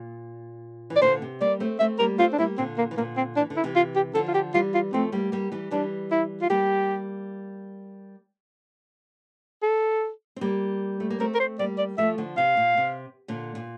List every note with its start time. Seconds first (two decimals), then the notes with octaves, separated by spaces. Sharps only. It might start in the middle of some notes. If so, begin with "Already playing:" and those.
Already playing: A#2
0.90 E3
0.96 D5
1.01 A#2 D3 C5
1.22 C3
1.41 G3 A#3 D5
1.60 A3 C4
1.79 A3 C4 E5
1.99 G3 A#3 A#4
2.19 A3 C4 F4
2.33 D4
2.38 G3 A#3 E4
2.58 A#2 D3 C4
2.78 A#3
2.91 E3
2.97 A#2 D3 A#3
3.17 C4
3.37 E3 D4
3.50 D3
3.57 E4
3.64 C3 E3
3.76 F4
3.95 G4
4.15 D3 F3 A4
4.28 F4
4.34 G4
4.54 E3 G3 F4
4.74 F4
4.93 F3 A3 C4
5.12 G3 A#3
5.32 G3 A#3
5.52 E3 G3
5.71 E3 G3 D4
6.12 E4
6.42 F4
6.50 G3 A#3 G4
9.63 A4
10.36 C4
10.41 G3 A#3
11.00 A3
11.10 A#3
11.20 A3 C4 A#4
11.35 A#4
11.40 C5
11.59 G3 A#3 D5
11.78 D5
11.98 F3 A3 E5
12.18 D3 F3
12.37 C3 F5
12.57 A#2
12.77 C3
13.28 A#2 D3
13.55 A#2